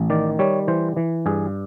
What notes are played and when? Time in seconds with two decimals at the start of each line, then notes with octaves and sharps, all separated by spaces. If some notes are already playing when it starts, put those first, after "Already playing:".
Already playing: A1
0.10 D#3 D5
0.39 G3 C#5
0.68 E3 C5
0.97 E3
1.26 G2 G#4